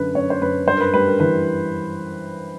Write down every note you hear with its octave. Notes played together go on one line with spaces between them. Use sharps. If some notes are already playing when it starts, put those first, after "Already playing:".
Already playing: F#2 D3 B4
F#2 C#5
C5
F#2 B4
G2 C5
A#4
B4
G3 B4
A#4
E3 B4